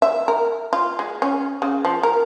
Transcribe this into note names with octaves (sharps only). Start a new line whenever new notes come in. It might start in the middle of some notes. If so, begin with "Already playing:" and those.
E5
A#4
F4
G#3
C#4
C#3
F3
A#4